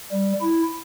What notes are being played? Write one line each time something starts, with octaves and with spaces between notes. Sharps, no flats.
G3
E4